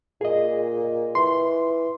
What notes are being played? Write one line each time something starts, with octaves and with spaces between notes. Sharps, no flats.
A#2 G#4 D#5
E3 C6